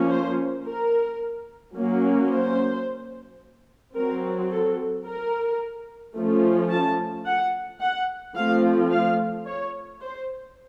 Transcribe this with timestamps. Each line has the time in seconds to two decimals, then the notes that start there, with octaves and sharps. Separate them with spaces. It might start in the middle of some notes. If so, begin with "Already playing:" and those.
Already playing: F3 A#3 C#4
0.10 C5
0.65 A#4
1.75 F#3 A#3 C#4
2.30 C5
3.95 F#3 C4 A#4
4.51 A4
5.06 A#4
6.15 F3 A3 C#4
6.70 A5
7.26 F#5
7.80 F#5
8.36 F3 A3 C4 F5
8.91 F5
9.46 C#5
10.01 C5